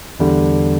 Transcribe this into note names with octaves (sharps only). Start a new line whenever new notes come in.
E2 D3 G3